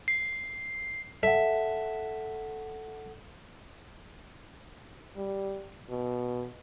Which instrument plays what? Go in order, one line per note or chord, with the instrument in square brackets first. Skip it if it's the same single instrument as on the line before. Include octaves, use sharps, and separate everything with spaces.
[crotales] C7
[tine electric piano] A4 F#5 [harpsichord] E5
[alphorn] G3
B2